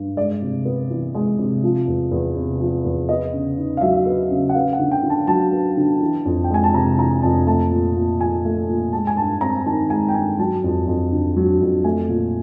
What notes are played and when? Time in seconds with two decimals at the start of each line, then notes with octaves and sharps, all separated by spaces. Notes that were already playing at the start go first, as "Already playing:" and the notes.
Already playing: G2
0.17 G#3 D5
0.42 C3
0.65 B3
0.90 E3
1.14 G#3
1.39 C3
1.63 F3
1.87 E2
2.11 E2
2.36 C3
2.60 F3
2.85 E2
3.09 B3 D#5
3.34 C#3
3.57 D#4
3.77 F5
3.81 F#3 E5
4.06 B3
4.31 C#3
4.49 F#5
4.55 B3 F5
4.73 F#5
4.79 D3
4.91 G5
5.03 D3
5.10 A5
5.27 F#3 A5
5.53 B3
5.77 D3
6.01 E3
6.25 F2
6.44 G5
6.50 G#3 G#5
6.64 A5
6.73 C3 A#5
6.98 E3 A#5
7.22 F2 A5
7.47 A3 A5
7.71 A#2
7.96 A#2
8.20 F3 G#5
8.45 A3
8.68 A#2
8.93 G#3 A5
9.07 G#5
9.17 G2 A5
9.41 C4 A#5
9.66 D#3 A5
9.90 G#3 G#5
10.09 G5
10.14 G2 G#5
10.39 F#3 A5
10.64 F2
10.87 F2
11.12 D3
11.36 F#3
11.61 F2
11.84 A3 G#5
12.09 A#2